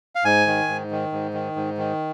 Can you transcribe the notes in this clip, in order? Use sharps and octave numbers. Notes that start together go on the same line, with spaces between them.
F5
G#2 G#5
D#3
G#2
D#3
G#2
D#3
G#2
D#3